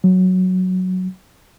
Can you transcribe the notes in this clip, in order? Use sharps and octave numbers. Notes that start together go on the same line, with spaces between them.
F#3